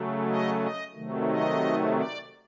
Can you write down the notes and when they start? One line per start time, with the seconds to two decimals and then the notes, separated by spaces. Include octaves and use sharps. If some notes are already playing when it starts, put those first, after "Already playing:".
Already playing: C#3 F#3 A3
0.27 D#5
0.61 D#5
0.94 C3 D#3 F#3 A3
1.28 D#5
1.95 D5